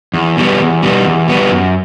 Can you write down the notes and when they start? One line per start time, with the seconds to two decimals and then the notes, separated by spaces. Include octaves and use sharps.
0.14 E2
0.37 B2 G3 B3
0.59 E2
0.82 B2 G3 B3
1.05 E2
1.28 B2 G3 B3
1.51 F#2